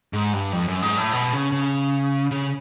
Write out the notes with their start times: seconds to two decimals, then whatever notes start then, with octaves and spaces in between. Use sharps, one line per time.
0.13 G#2
0.33 G2
0.52 F2
0.68 F#2
0.82 G#2
0.98 A2
1.13 B2
1.33 C#3
1.52 C#3
2.31 C#3